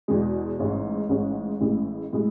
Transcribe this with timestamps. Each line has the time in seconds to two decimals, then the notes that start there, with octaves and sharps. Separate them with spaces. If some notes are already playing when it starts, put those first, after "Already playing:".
0.08 E2 B2 G#3
0.59 A1 G#2 G#3 C#4
1.09 A1 G#2 G#3 C#4
1.60 A1 A2 G#3
2.13 A2 G#3